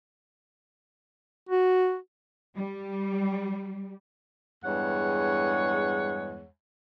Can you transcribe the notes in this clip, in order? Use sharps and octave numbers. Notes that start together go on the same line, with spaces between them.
F#4
G3
E2 G2 G#3 C#5 F#5